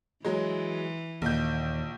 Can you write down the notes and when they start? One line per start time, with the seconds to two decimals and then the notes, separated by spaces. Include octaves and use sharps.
0.25 E3 F#3 G#3
1.22 A#1 D#2 G6